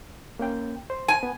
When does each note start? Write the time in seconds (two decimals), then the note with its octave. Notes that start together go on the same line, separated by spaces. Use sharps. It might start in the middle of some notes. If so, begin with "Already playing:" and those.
0.39 A#3 C#4 G5
0.90 C5
1.08 G#5
1.23 B3